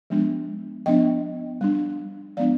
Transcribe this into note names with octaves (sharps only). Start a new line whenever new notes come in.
F3 G#3 B3 D4
F3 B3 D4 D#5 G5
G3 D4
F3 G#3 B3 D4 D5 F5